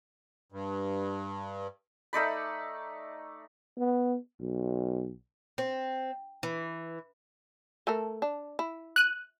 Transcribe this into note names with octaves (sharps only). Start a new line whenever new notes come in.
G2
A3 D#4 D5 B5
B3
B1
C4
E3
A3 A4 A#4
D4
E4
F#6 D#7